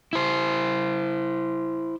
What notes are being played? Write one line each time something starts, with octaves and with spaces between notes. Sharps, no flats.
E4 C5